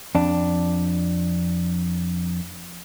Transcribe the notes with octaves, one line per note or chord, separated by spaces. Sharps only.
F2 D4